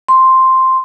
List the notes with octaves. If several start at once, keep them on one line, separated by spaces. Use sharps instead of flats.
C6